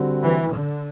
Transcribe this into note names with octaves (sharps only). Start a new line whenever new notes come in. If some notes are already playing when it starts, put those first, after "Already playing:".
Already playing: D3 G3 C4 F#4
E3
D3